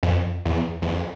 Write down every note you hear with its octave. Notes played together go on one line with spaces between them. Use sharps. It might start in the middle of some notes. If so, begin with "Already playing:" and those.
F2
E2
E2
F2